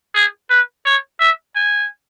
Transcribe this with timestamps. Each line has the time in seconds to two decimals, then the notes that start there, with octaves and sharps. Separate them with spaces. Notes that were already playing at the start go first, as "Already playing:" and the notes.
0.15 G#4
0.50 B4
0.86 C#5
1.20 E5
1.56 G#5